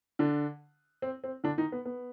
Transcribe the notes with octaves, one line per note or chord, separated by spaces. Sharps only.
D3 D4
C4
C4
D3 D4
D#3 D#4
B3
B3